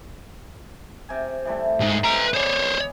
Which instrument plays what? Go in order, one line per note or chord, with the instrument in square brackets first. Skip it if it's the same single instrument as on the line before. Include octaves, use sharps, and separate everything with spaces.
[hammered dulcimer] C3 G#5
E3 G3 A3
[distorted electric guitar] C2 G#2
[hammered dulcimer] G#3 C4 C5 [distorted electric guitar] B4 A#5
[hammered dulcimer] B3 G#4 D6 [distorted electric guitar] C5 C#5